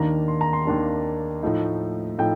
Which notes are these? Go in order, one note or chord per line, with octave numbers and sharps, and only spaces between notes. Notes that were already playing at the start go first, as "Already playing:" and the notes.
Already playing: D#2 D#3 A#3 D4 A#5
C6
A#5
C6
D#2 D#3 A#3 D4
A2 F3 A3 D#4
A2 F3 A3 D#4 G5